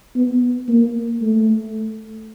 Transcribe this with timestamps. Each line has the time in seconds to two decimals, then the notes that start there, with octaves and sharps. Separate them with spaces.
0.16 B3
0.69 A#3
1.22 A3